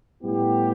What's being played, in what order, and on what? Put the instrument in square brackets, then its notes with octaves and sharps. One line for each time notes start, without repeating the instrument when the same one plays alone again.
[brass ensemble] A2 G3 B3 E4 G4